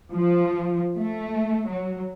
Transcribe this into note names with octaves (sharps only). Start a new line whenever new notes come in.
F3
A3
F#3